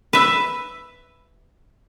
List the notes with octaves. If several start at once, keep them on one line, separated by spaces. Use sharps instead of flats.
B4 E5